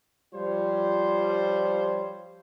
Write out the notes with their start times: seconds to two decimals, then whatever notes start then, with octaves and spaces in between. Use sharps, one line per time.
0.34 F3 G3 F4 C5 C#5